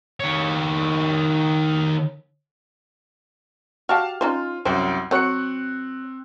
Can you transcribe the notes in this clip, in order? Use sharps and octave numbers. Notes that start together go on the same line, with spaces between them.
D#3 C#5
F#4 G4 F5 A5 F6
C#4 D#4 F4 C5
C2 F#2 C5 G5
F#3 C4 C#5 F#6 C#7